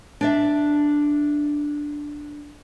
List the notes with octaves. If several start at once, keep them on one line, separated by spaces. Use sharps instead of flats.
D4 D5 E5